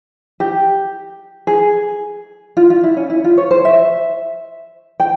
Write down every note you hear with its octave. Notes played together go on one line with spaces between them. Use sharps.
G4
G#4
F4
F4
E4
C#4
E4
F4
C#5
C5
E5
G5